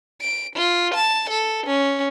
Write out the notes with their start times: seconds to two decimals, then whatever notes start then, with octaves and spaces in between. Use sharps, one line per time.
0.21 D7
0.56 F4
0.94 A5
1.30 A4
1.66 C#4